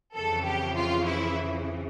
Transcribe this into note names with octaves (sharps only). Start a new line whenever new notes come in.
F2 C#3 E3 A4
G4
F4
E4